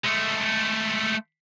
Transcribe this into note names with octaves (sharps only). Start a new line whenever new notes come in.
G#3 A3